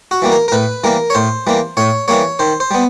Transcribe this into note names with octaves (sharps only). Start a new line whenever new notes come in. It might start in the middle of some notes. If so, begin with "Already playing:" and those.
F#4
E3 G3 A#3
A#4
A#4
A2 B4
E3 G3 A#3 A#4
C#5
A2 C5
E3 G3 A#3
A2 C#5
E3 G3 A#3 C#5
D#3 C5
C5
G3 B3